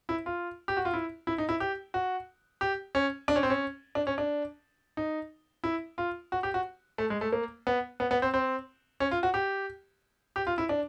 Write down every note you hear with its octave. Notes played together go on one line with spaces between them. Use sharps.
E4
F4
G4
F#4
F4
E4
E4
D#4
E4
G4
F#4
G4
C#4
D4
C#4
C4
C#4
D4
C#4
D4
D#4
E4
F4
F#4
G4
F#4
A3
G#3
A3
A#3
B3
B3
B3
C4
C4
C#4
F4
F#4
G4
G4
F4
E4
D4